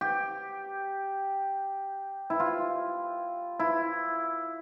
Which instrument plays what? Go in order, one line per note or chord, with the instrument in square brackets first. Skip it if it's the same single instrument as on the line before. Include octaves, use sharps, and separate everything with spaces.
[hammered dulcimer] G4
E4
F4
E4